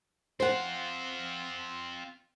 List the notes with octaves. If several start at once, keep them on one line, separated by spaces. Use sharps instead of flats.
C4 F4 C5 F#5